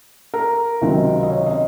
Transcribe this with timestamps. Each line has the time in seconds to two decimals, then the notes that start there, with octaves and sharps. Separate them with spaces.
0.34 A#4
0.81 C#2 C3 D#3 F#3 C4
1.23 D#5
1.30 C#5
1.46 D#5